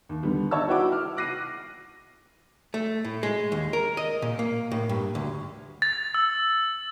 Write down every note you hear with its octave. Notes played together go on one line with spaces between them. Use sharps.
D#2
D3 D#3 G3 B3
D#4 C#5 A5 E6
E4 F#4 B4 F#5 G5 D6
F6
D6 F#6 A#6 C7 D#7
A3
A2
G#3
D#2
A#4
D#5
A#2
A#3
A2
G2
D2
A6
E6